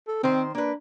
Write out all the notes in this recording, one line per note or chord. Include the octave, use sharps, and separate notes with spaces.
A4
D#3 C4 C5
A#3 D4 B4